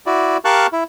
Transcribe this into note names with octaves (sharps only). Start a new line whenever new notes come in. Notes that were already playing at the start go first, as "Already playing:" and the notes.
E4 F#4 D5
G4 A#4 F5 A5 C#6 F#6
E4